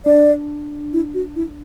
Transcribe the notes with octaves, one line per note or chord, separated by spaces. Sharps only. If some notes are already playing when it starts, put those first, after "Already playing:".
D4 D5
E4
F#4
E4